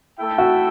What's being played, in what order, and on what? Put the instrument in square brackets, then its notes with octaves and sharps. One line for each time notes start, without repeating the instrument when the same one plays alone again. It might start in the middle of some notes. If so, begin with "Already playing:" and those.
[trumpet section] A3 E4 A4 E5 G5
[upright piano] F#4